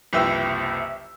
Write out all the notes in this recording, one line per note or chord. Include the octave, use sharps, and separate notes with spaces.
F#1 C2 F3 B4 G5 E6